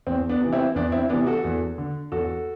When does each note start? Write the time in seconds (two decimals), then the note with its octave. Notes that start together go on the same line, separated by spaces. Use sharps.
0.07 E2 C4
0.29 B3 D4
0.41 C3 E3
0.53 C4 E4
0.75 E2 B3 D4
0.92 C4 E4
1.09 E3 B3 D4
1.13 C3
1.26 F#4 A4
1.44 E2
1.78 D3
2.12 E2 F#4 A4